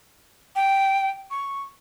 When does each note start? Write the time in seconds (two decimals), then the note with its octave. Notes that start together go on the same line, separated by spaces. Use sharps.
0.56 G5
1.31 C#6